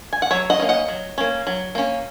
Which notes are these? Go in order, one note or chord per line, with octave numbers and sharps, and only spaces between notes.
G#5
F#5
F#3 C#5 E5
D#5 F#5
A#3 C#4
D#5 F#5
F#3
A#3 C#4
F#3
A#3 C#4